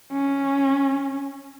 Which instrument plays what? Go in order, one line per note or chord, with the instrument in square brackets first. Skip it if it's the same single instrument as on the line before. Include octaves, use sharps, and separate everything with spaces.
[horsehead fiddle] C#4